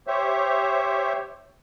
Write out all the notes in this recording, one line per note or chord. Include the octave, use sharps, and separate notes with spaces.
G4 C5 C#5 E5